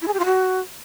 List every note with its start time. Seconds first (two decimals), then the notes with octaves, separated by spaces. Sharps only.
0.02 E4
0.08 G#4
0.13 G4
0.19 F4
0.25 F#4